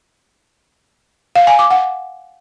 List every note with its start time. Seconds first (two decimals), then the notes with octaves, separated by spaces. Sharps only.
1.35 F5
1.47 G#5
1.59 D6
1.71 F#5